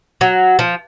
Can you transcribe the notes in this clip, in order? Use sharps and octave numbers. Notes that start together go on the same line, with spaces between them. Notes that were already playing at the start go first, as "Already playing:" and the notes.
F#3
F3